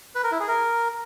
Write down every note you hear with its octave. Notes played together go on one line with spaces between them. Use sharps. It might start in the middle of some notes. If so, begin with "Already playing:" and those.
B4
A#4
E4
G#4
A#4